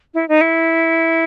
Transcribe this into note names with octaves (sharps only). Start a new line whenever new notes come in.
E4
D#4
E4